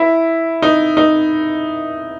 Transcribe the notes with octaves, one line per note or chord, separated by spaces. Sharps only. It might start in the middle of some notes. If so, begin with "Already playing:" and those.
Already playing: E4
D#4
D#4